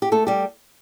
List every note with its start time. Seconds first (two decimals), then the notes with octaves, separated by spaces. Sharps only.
0.02 G4
0.12 A3 A4
0.27 G3 G4